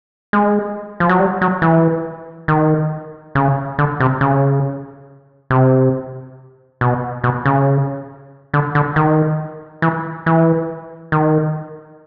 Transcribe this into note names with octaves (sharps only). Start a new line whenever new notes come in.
G#3
F3
F#3
G3
F#3
E3
D#3
C#3
D3
C3
C#3
C3
B2
B2
C#3
D3
D3
D#3
E3
E3
D#3